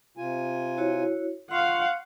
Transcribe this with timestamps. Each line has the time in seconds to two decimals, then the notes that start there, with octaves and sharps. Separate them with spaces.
0.17 C3 F4 G#5
0.77 E4 F#4 C#5
1.51 F4 F5 F#5 C6 C#6